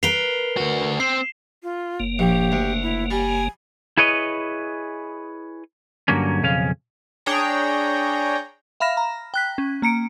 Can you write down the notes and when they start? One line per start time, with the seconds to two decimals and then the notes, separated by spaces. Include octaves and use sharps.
0.03 A#4 B4 C7 F7 G7
0.57 D2 F#4
1.00 C4 C7 E7
1.63 F4
2.00 F#1 A#3
2.19 A#1 G4
2.52 D2
2.82 E4
3.10 G3 G#5
3.97 E4 G#4 B4 C#5 D#5
6.08 G2 D3 F#3 A#3 C#4
6.43 B1 F2 C#3 C#4 F5
7.26 D4 G#4 C#5 G5 A#5
8.80 E5 F5 B5 F6 A#6 E7
8.97 A#5
9.34 G5 F#6 B6
9.58 C#4
9.82 A#3 A#5 C#7 D7